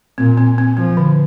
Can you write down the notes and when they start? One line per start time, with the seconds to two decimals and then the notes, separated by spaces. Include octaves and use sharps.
0.18 A#2 C4
0.38 C4
0.58 C4
0.77 F3 C4
0.97 D3